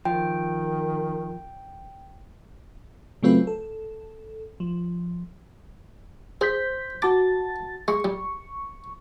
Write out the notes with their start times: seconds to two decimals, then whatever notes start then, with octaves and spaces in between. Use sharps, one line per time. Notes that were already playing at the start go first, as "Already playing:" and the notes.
0.05 D#3 F3 G5
3.23 C#3 F#3 A3 C4 F4 B4
3.47 A4
4.60 F3
6.41 G#4 C5 G6 B6
7.02 F#4 A5 D6 A6
7.88 G#3 C#6
8.05 G3